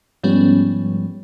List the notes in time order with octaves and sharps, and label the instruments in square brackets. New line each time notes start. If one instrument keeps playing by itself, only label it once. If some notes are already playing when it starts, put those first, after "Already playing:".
[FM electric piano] G#2 F3 G3 B3 C#4